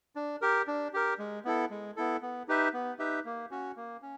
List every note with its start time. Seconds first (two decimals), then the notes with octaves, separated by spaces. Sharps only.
0.16 D4
0.41 G4 A#4
0.67 D4
0.93 G4 A#4
1.19 G#3
1.45 B3 E4 A4
1.70 G#3
1.96 B3 E4 A4
2.22 B3
2.48 D#4 G4 B4 E5
2.73 B3
2.99 D#4 G4 B4 E5
3.25 A#3
3.51 C#4 F#4
3.76 A#3
4.02 C#4